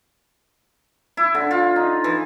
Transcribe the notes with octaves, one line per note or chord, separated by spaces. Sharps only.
E4
D3
F4
D#4
E3